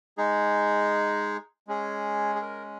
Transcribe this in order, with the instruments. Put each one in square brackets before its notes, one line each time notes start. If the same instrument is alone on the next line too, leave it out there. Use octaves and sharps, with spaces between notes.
[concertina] G#3 D#4 G#4
G#3 C#4 G#4
G#4
A#4